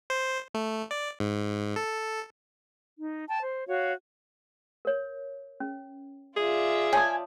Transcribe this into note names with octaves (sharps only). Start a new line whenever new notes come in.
C5
A3
D5
G#2
A4
D#4
G5 A5
C5
F#4 C#5 F5
A#4 C#5
C#4
F4 G#4 D5 E5
C#5 G#5 A5 D#6